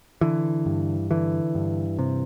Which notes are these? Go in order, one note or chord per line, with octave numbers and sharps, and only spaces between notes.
D3 E3
G2
D3 E3
G2
C3